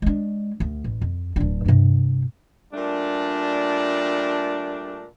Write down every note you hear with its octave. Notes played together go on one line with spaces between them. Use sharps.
G#3 D4
D2
A1
F2
D1 D4
G2 C3
A#2 G3 A3 D4